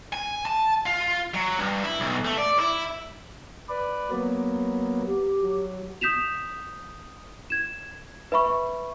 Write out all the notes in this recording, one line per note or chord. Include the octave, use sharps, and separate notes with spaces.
G#5
A5
F4
F#3
G2
E4
B1
A3
D5
E4
B4 D5
F#3 A#3 B3
G4
F#3
D#6 G6 B6 E7 F7
G#6 E7
B4 E5 B5 C#6